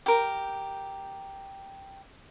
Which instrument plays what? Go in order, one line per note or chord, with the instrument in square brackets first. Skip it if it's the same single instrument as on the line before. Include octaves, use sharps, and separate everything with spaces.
[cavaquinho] G4 A#4